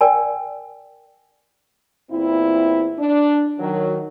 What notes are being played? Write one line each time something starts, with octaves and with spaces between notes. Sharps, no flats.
A#4 D5 G5 G#5
E2 A#2 C4 E4
D4
D#3 F#3